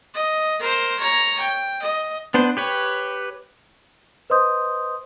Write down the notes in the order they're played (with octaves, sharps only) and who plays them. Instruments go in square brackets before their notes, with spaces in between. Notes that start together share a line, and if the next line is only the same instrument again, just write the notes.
[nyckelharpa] D#5
A#4 C5
C#5 A#5
G5
D#5
[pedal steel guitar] B3 D4 B4 C5
G4 B4 C#5
[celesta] B4 C5 D#5 C6 D#6 G6